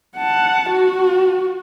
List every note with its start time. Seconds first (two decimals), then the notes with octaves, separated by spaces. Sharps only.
0.17 F#5 A5
0.69 F#4